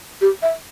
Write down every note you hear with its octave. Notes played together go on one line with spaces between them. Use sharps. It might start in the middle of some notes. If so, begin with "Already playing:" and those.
G4
E5